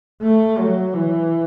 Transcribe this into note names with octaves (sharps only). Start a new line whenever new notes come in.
A3
F#3
E3